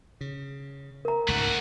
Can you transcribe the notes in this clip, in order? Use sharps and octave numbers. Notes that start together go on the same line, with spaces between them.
C#3
A#4 A#5
C#2 G#2 A3 F#4